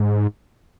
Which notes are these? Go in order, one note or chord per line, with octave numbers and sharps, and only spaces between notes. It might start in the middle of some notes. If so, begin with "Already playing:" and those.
Already playing: G#2